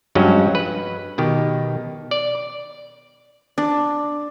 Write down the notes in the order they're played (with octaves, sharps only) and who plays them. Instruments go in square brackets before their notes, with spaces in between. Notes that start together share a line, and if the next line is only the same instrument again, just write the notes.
[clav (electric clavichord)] G2 F3 F#3 G#3 C#4 F#4
B4
B2 D#3 G4
D5
[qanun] D4